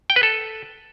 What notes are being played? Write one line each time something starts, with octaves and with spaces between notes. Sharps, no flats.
G5
B4
A4